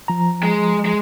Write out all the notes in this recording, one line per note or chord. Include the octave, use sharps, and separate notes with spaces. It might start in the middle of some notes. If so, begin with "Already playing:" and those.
F3 A#5
G#3
G#3